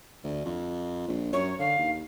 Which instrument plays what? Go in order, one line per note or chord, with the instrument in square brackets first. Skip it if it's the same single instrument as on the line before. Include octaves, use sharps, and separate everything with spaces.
[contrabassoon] D2
F2
A#1
[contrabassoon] F#2 [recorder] C#5
[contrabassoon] D3 [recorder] F5
[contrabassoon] D#2